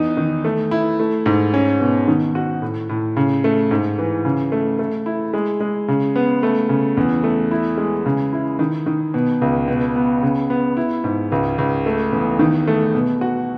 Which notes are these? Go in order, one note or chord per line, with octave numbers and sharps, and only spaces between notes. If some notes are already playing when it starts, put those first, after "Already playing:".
Already playing: E2 D#4
D#3
A3
E4
A3
G#2
C#4
B2
D#3
F#4
A2
A2
C#3
A3
G#2
E3
C#3
A3
A3
E4
G#3
G#3
C#3
B3
A3
C#3
E2
A3
E4
G#3
C#3
E4
D#3
D#3
B2
C#2
B2
B3
C#3
B3
E4
G#2
C#2
C#2
A3
E2
D#3
A3
B2
F#4